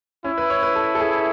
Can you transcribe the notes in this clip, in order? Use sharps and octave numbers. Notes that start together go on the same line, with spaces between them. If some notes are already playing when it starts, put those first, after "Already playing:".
C#4 E4
B4
C#5
B4
A4
A4
G#4